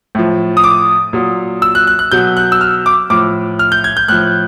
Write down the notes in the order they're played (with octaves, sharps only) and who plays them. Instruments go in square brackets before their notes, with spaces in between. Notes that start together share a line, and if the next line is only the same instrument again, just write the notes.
[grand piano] A2 F3
D#6
D6
A#2 F#3
E6
F#6
F#6
F#6
B2 F#3 G6
F#6
E6
F6
D6
A2 F3 D6
F6
G6
G#6
G6
A2 F3 F#6